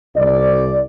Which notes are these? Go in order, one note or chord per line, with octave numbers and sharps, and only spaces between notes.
C2 D5